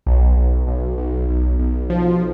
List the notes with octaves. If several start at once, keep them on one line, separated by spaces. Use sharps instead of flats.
B1
B1
B1
B1
B1
B1
F3